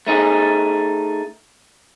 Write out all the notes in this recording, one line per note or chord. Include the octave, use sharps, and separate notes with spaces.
A3 D#4 G#4